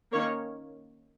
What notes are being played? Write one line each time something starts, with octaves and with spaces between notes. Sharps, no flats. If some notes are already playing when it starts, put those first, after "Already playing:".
D#3 A#3 C#4 C#5